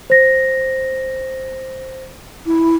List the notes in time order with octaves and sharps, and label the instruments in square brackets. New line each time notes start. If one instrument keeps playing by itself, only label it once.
[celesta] C5 A#6
[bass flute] E4